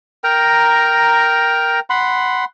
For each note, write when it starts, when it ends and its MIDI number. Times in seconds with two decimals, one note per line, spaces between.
0.24 1.80 70
0.24 1.80 79
0.24 1.80 82
1.90 2.45 78
1.90 2.45 83
1.90 2.45 84